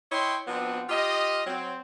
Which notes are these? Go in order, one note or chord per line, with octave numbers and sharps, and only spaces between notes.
E4 C#5 D#5 G5 C6
B2 F3 B3 C4 D4
F4 G4 D#5
F#3 C4